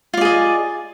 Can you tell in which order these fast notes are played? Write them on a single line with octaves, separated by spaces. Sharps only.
F4 D5 G#4 D#5